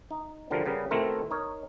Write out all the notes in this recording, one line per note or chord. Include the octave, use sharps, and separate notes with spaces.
D#4
B2 D3 F3 G3 A#4
C#3 G3 B3 A#4
B2 D#3 A3 C4 E4 A#4
D#4 A#4 C#5